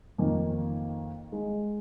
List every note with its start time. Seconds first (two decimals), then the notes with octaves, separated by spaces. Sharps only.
0.18 F2 D#3 A#3
1.32 G#3 D#4